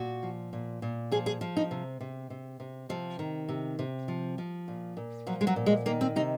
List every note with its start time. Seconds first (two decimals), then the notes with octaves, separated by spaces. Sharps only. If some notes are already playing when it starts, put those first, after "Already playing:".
Already playing: A#2 F#4
0.23 F3
0.53 A#2
0.82 A#2
1.12 F3 G#4
1.26 G#4
1.41 F3
1.57 D#4
1.71 C3
2.01 C3
2.30 C3
2.60 C3
2.89 C3 F3
3.19 D#3
3.49 C3
3.79 C3
4.08 F3
4.38 F3
4.68 A#2
4.97 A#2
5.27 F3 F#3
5.41 G#3
5.47 F#3
5.56 A#2
5.66 G#3
5.86 D#3 A#3
6.01 C4
6.16 C3 D#4